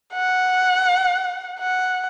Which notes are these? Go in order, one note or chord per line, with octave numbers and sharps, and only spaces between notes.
F#5
F#5